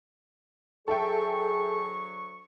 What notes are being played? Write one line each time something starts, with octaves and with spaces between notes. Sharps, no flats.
D2 F#3 G#4 A4 E5 G5 C#6